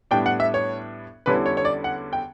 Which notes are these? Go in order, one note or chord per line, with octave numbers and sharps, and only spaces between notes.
A2 G3 B3 D4 G5
F#5
E5
C#5
E2 D3 G3 C#4 E4 B4
C#5
C#5
D5
F#5
G5